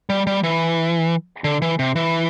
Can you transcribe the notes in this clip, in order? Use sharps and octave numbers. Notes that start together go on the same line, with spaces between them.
G3
G3
E3
D3
E3
C3
E3